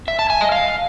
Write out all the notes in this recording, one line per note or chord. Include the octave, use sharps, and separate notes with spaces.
E5
A5
G#5
D#5
F5